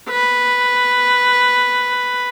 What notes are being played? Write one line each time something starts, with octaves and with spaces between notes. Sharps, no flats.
B4